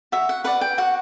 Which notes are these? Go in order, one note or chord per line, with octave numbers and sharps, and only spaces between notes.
F#4 E5
F#5
B4 D5 F#5
G5
F#4 F#5